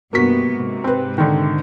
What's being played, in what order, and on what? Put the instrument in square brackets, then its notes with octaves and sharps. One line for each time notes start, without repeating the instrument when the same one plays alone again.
[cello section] G2 C3 B3 [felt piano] A#3 F#4 B6
[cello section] G#2 C3
[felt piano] C4 B4
D3 D#3